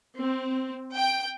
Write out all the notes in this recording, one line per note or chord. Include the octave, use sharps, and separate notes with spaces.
C4
G5